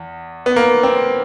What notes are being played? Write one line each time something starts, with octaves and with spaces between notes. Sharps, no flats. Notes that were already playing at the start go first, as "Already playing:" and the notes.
Already playing: E2
B3
A#3
C4